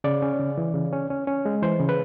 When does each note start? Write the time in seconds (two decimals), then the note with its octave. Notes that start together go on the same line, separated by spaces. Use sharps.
0.04 C#3 D5
0.22 C#4
0.40 C#3
0.58 E3
0.74 C#3
0.93 C#4
1.10 C#4
1.27 C#4
1.46 G#3
1.63 E3 C5
1.80 C#3
1.89 B4